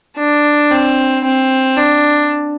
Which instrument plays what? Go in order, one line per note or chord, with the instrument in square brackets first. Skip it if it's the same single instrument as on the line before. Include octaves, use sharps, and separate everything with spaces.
[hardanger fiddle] D4
C4
C4
D4